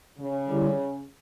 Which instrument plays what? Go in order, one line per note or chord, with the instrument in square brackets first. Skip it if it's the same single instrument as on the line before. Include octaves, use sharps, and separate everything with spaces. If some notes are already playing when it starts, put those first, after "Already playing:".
[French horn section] C#3
[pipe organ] D3 G3 C#4 E4 G4